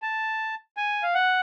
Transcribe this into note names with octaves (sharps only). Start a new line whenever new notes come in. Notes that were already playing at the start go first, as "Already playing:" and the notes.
A5
G#5
F5
F#5